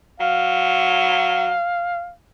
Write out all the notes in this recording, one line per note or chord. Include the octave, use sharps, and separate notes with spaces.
F#3 F5